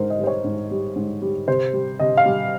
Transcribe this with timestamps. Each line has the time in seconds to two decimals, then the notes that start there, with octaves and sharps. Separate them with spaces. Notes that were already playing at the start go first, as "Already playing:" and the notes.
Already playing: G#2 A#4 C5
0.10 D#5
0.19 G3 C5
0.27 C#5
0.44 G#2
0.71 G3
0.96 G#2
1.22 G3
1.48 C3 C5
1.74 G3
2.00 C3 D#5
2.17 F5
2.26 G3